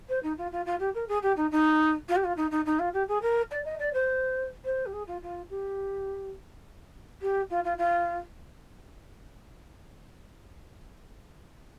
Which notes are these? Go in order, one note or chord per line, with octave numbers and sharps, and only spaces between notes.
C5
D#4
F4
F4
F4
G4
A#4
G#4
G4
D#4
D#4
F4
G4
F4
D#4
D#4
D#4
F4
G4
G#4
A#4
D5
D#5
D5
C5
C5
G4
G#4
F4
F4
G4
G4
F4
F4
F4